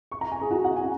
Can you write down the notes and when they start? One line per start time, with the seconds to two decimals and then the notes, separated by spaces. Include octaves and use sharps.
0.12 C#6
0.21 A#5
0.32 G#5
0.41 G#4
0.51 F#4
0.64 F#5
0.76 G#5